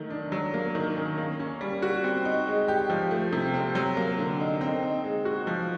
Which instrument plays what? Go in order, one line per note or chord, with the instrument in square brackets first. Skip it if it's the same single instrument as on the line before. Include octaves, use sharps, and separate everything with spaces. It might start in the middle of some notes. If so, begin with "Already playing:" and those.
Already playing: [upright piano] D#3 F#3 A3
D4
F#3
A#3
D#3
C#4
A#3
C#4
G3
F#4
C4
D#4
G#3
G4
F3
A3
C3
C4
F#3
A#3
D3
D#4
C4
D#4
G#3
F#4
F3